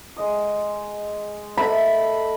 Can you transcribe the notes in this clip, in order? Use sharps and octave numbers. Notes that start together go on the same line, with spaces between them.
G#3 D#5 D#6
A3 D#5 B5